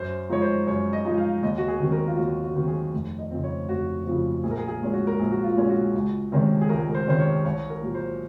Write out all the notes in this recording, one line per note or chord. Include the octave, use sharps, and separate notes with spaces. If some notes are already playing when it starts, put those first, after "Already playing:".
Already playing: F#2 C5
F3 G#3 D#4 C#5
C5
F#2 C#5
D#5
F3 G#3 D#4
F5
D#2 D#5
F#4
G#4
D#3 F#3 C4
A#4
F4
D#2 F#4
F#4
D#3 F#3 C4
G#4
F1
D#5
F2 C#3 F3 C4
C#5
F1 F#4
F2 C#3 F3 C4 F#4
A#1 G#4
A#4
G#4
G#4
A#2 G#3 C#4
F#4
A#4
A#1 G#4
F#4
F4
A#2 G#3 C#4
F#4
C#2
C3 D#3 G#3 C#4
G#4
C#2 A#4
A#4
C5
C3 D#3 G#3 C#4 C5
C#5
C2 C#5
A#4
A#2 F#3
C5